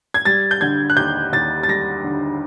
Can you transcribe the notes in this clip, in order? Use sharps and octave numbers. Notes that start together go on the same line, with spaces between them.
G#6
G3 A6
G6
D3 G#6
F#6
D#2 G6
D#2 A6
A6
G3 A#6
D3